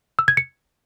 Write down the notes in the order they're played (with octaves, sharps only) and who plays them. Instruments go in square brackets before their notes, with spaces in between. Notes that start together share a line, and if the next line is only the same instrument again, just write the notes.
[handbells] E6
G#6
C#7